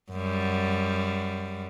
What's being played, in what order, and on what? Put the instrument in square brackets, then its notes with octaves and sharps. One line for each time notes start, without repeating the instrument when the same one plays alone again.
[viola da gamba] F#2 G3